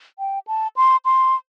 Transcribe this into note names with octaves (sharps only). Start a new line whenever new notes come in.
G5
A5
C6
C6